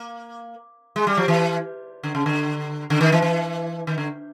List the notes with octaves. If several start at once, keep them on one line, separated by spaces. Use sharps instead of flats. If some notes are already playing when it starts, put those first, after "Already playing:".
Already playing: A#3
G#3
G3
F3
E3
D3
C#3
D3
D3
D#3
E3
E3
D#3
D3